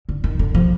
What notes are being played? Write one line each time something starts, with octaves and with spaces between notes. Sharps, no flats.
D3
D#3
D3
F3